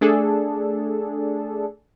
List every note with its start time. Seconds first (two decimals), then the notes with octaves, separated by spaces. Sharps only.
0.01 A3 D4 G#4 A4